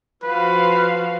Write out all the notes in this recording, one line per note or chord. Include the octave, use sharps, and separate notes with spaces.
F3 F#4 B4 F5